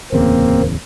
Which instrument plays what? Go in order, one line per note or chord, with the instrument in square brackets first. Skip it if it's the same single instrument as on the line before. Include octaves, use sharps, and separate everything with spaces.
[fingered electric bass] D1 E2 C#3 [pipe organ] A#3 C4